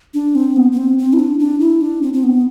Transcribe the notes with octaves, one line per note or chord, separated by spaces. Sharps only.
D4
C4
B3
B3
C4
C4
E4
D4
D4
E4
D4
C4
C4
B3